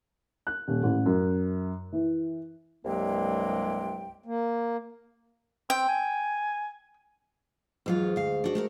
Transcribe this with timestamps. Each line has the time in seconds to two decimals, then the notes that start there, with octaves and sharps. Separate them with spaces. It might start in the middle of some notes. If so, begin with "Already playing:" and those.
0.47 F#6
0.68 D#1
0.83 A1
1.06 F#2
1.92 E3
2.86 C2 G2 F#3 G#3 A#3 G5
4.26 A#3
5.70 C4 G5
5.89 G#5
7.86 E2 G#2 F#3 F4
8.16 D2 F5
8.44 D4 F#4
8.55 A3 F#4 A#4